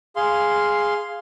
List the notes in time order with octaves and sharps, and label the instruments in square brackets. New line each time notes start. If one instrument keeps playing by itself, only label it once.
[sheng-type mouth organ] G#4 F5 C6